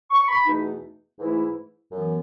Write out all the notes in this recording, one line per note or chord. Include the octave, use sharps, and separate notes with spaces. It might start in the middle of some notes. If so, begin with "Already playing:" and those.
C#6
B5
E2 B2 A3 D#4
G#2 E3 A3 E4
F#2 E3 B3